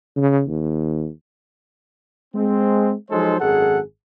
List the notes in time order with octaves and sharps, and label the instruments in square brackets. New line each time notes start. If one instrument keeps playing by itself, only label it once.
[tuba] C#3
D#2
[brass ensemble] G#3 C4
F3 F#3 G#3 D#4 A4 C5
G#1 F#2 D#3 G#4 A4 F#5